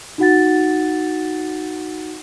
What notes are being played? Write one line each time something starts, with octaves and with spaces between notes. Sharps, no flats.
D#4 F#4 F#5 A6